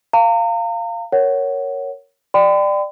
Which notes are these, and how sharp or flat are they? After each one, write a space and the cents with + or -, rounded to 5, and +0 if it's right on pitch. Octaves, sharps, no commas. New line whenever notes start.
F5 -10 A#5 -40
A#4 -5 C#5 +0 F#5 +10
D5 +20 G5 +0 B5 +45